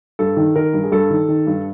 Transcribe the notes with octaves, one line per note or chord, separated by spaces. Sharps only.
G2 A4
D#3
D#3 A#4
G2
G#4
G2 A4
D#3
D#3
G2